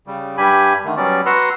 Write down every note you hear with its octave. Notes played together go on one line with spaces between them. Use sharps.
C#3 G3
G2 G3 G4 G#5 B5
D3 D#3 A3
F#3 G3 B3 C#4 D5
F#4 B4 F#5 A#5 C6 E6